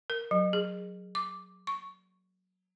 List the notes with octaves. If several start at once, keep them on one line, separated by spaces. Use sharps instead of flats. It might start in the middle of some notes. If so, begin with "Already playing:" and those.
A#4
F#3
G#4
D6
C#6